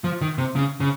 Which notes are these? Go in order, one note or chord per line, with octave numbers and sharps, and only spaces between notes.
F3
D#3
C3
C#3
C#3